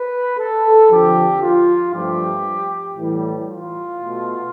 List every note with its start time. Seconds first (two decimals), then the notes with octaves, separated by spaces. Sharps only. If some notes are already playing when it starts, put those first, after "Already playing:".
Already playing: B4
0.38 A4
0.90 F2 D3 F3 G4
1.42 F4
1.93 G2 F3 A3 G4
2.97 A2 E3 G3
3.49 F4
4.00 B2 A3